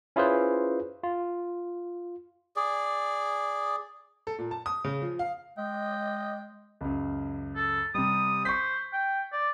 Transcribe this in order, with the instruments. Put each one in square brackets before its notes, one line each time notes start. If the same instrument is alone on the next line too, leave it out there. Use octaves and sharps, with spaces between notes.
[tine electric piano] C#4 E4 F4 G#4 B4 C5
F4
[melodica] G#4 D5
[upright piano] A4
A#2
A5
D#6
C#3
F3
F5
[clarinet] G#3 [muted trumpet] D#5 [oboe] G5
[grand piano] C#2 F#2
[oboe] A4
[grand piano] C3 G3 [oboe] D#6
[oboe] C5 [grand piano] C#6 B6
[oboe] G5
D5